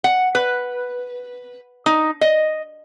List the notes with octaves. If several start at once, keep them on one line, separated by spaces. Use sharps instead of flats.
F#5
B4
D#4
D#5